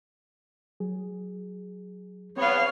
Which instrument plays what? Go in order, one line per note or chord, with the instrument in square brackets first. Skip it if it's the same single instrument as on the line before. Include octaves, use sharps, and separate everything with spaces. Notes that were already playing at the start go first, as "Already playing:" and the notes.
[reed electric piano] F#3 G#4
[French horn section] E2 B3 [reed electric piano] C4 [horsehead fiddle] C#5 F5